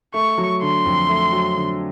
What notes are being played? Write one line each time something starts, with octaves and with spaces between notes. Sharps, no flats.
A3 C#6
F#3
D3 C6
F2
A3
F#3
D3